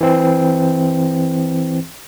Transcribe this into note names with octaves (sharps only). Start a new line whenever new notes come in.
E3 C4